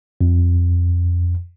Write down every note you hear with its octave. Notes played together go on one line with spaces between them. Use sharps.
F2